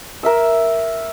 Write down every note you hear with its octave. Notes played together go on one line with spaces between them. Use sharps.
A#4 E5 E6